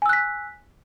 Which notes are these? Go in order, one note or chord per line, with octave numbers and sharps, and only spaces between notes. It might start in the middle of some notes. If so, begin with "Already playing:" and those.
G#5 E6 F#6 B6